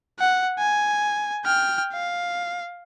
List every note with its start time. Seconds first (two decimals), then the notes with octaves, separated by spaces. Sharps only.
0.19 F#5
0.59 G#5
1.45 G5 F6
1.93 F5